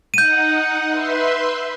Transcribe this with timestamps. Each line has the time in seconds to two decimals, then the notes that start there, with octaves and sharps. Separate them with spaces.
0.14 D#4 F#5 G6 D#7
0.88 B4 E5 C6